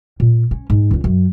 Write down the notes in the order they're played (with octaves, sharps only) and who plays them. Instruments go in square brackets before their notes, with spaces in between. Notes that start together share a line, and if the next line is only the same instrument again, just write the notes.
[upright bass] A#2
C#4
G#2
C#2 D3
F#2